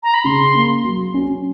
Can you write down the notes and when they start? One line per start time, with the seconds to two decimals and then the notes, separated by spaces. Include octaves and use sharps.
0.03 A#5
0.14 B5
0.24 C#3 C6
0.55 A#3
0.85 F#3
1.14 C#4